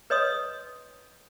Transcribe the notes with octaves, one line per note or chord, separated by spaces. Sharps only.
B4 C#5 D#5 C6 D#6